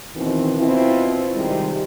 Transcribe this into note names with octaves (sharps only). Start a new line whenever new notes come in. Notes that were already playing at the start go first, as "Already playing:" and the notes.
B2 D#3 E3 C4
B2 C4 E4 F4
C3 D#3 G3 G#3